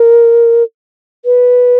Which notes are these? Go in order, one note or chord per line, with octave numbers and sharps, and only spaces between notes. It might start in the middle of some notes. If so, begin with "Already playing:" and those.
Already playing: A#4
B4